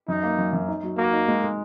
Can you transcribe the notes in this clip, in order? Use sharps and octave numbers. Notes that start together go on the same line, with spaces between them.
F#2 D#4
A#3
F#2
F#2
D#4
F#3
A#3 F#4
D#4
G#3
G#3